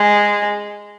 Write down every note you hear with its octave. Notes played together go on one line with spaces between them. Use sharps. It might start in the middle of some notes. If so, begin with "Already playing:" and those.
Already playing: G#3